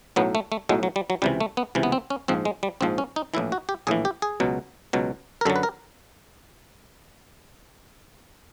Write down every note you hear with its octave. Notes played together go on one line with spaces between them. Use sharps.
B1 A2 F#3 B3
A3
A3
B1 A2 F#3 G#3
F#3
G3
F#3
C#2 C3 E3 G3
A3
B3
C#2 C3 E3
B3
C4
C#4
A#1 G#2 F3 C4
G#3
G3
A#1 G#2 F3 C4
C#4
D#4
A#1 A2 E3 E4
F#4
G4
A#1 A2 E3 G#4
G4
G#4
C#2 B2 F#3
C#2 B2 F#3
A#4
F#2 D3 F#3 A4
B4
A#4